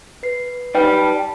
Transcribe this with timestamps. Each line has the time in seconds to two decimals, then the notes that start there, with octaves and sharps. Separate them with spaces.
0.23 B4 C7
0.75 D#4 B4 D5 G5 F6
0.99 A5